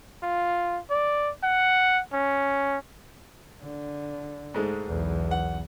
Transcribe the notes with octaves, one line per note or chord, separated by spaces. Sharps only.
F4
D5
F#5
C#4
D3
G#2 G#3 A3
B1 E2
F#5